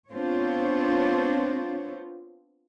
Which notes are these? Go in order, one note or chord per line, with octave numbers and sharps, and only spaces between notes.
B3 C4 D4 F4 C5 C#5